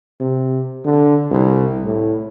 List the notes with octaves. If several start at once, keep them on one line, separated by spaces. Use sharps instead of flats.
C3
D3
C2
A2